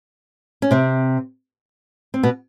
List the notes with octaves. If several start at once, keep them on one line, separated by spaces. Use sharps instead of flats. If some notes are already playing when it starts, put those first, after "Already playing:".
C#4
C3 C4
C4
B2 B3